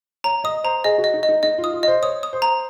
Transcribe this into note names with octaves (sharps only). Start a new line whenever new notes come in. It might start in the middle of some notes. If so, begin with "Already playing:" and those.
C#5 A#5
D#5 D#6
C5 A#5
G#4 D#5
F#4
D#5
D#4
D#5
D#4
D#4 D#5
F4
D#6
F4
C5 D#5
C#5 D#6
D#6
C5
A#5